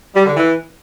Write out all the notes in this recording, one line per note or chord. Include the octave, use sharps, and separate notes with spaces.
G3
D3
E3